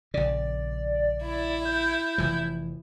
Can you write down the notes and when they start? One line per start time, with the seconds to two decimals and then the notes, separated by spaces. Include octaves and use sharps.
0.14 A#1 C#3 D5
1.22 E4
1.65 G6
2.18 F1 E3 F3